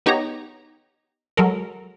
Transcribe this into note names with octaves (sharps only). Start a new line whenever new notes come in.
B3 D#4 G4 C#5 A#5
F#3 G#3 A4 A#4